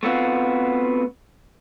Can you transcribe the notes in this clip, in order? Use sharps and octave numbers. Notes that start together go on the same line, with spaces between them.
A3 B3 C4 F4 F#4